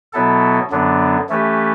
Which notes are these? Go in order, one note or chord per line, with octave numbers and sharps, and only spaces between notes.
B2 F#3 B3 E4 A4
F#2 D3 F#3 B3 D4
E3 A3 C#4 G4 B4